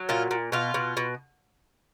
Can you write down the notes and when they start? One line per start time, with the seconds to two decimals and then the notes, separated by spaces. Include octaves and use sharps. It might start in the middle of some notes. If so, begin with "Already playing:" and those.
Already playing: F#3
0.09 A#2 F4
0.31 A#2
0.52 B2 F4
0.74 B2
0.97 B2